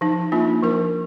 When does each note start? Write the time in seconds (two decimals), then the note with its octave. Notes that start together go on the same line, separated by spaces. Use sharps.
0.01 F3 D#4
0.32 A#3 D4 F4
0.63 F3 A#4